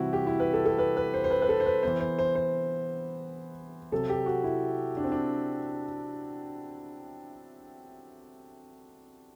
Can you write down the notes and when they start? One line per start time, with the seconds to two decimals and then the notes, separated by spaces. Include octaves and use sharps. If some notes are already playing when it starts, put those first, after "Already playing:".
Already playing: C3 E3 G3 C4 E4 F#4
0.13 G4
0.27 E4
0.40 B4
0.53 A4
0.65 A4
0.78 B4
0.97 B4
1.14 C5
1.24 C5
1.31 B4
1.42 B4
1.49 A4
1.60 C5
1.66 B4
1.83 E3 B3 C5
2.00 C5
2.19 C5
2.35 C5
3.92 C3 F#3 C4 A4
4.09 G4
4.26 F#4
4.44 E4
4.97 D4
5.04 C4
5.12 D4